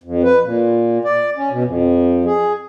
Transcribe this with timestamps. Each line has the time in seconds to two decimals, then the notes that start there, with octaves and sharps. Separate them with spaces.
0.04 F2
0.23 B4
0.43 A#2
1.04 D5
1.37 C#4
1.50 B2
1.64 F2
2.25 G#4